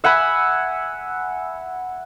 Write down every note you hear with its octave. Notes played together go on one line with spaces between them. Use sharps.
E5 F#5 G#5 B5